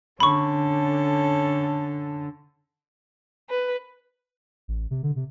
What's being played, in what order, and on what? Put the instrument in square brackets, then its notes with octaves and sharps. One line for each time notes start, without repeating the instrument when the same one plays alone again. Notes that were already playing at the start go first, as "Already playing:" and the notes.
[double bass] D3 [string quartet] C#4 A4 [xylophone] B5 C#6
[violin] B4
[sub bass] A1
C3
D3
C3